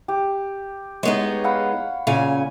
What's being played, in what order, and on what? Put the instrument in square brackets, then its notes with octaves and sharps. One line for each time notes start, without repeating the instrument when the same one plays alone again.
[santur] G4
[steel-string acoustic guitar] G#3 B3 D#4 [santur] C#5
[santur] F5 F#5 B5
[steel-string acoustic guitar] A#2 C#3 G#5